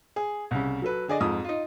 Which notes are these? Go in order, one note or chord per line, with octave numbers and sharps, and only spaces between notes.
G#4
C2 C#3
F#3 A4 B4
D3 G#4 D5 D#5
F2 G#2 D#6
D#4 F4